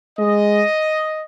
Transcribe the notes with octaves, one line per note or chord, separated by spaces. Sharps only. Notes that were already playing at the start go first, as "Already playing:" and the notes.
G#3 D#5